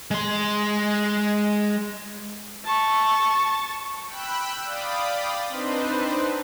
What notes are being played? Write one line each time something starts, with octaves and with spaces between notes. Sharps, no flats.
G#3 C6
A5 C#6
G5 B5 E6 F#6
D5 F5 G5 B5 D#6
C4 D4 D#4 B4 C5